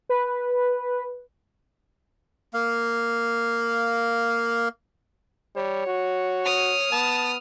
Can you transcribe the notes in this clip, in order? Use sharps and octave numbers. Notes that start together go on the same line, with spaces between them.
B4
A#3 F5
G3 C#5
F#4
D#6 F6
B3 A5